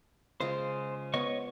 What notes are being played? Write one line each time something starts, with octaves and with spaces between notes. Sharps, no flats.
C#3 G#3 F4 C5
B3 C#5 D#5 C#6